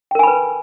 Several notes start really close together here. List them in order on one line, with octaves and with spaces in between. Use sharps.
G5 A#4 G#5 B5 B4